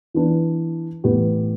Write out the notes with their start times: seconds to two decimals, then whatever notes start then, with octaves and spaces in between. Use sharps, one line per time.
0.14 E3 B3 D4 B4
1.04 A2 E3 B3 G4 B4